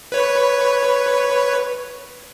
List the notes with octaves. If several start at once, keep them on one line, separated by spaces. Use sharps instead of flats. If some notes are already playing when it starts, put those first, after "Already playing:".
B4 C#5